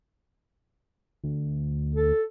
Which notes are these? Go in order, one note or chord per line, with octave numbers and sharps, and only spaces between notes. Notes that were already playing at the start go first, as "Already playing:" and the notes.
D2
A4